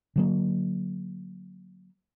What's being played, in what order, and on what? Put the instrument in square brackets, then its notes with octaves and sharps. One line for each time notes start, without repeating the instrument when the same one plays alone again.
[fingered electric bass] D3 F#3 A#3